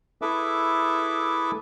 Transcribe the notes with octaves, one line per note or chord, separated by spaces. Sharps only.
E4 G#4 A4 B4 E5 D6